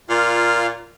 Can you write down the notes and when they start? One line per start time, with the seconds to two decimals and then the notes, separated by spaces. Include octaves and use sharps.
0.09 A#2 F4 F5 F6